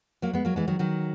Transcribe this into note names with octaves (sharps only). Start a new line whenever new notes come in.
F#3 A#3
G#3 B3
F#3 A#3
E3 G#3
D#3 F#3
D#3 F#3